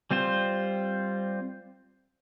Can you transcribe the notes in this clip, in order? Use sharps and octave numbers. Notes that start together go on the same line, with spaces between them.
G3 C4 F4 C5